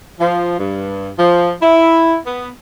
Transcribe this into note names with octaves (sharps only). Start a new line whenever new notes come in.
F3
G2
F3
E4
B3